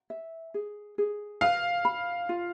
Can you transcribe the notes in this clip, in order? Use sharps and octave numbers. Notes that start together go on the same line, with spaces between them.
E5
G#4
G#4
B4 F5
B5
F4